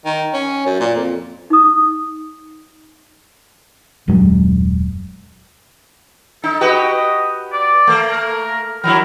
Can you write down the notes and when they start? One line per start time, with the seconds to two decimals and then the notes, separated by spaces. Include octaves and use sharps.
0.05 D#3
0.33 C#4
0.66 F#2
0.80 A#2
0.95 F2
1.50 D#4 D#6
4.08 D#1 F#2 F#3 G#3
6.44 D#4 A4
6.61 F#4 G4 B4 D#5
7.53 D5
7.87 A3 A#3
8.11 A#4
8.84 F3 F#3 E4 A#4